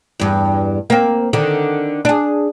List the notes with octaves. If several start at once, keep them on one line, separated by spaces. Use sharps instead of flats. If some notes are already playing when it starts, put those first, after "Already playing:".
E2 G2
A#3 C4
D3 D#3
D4 G#4